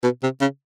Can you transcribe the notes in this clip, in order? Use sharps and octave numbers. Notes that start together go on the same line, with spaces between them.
B2
C3
C#3